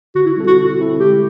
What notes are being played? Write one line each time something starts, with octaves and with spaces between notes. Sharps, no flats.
D3 F#4
E4
G3 C4 E4 A4
F#4
D3
G3 C4 E4 A4
G#3 G4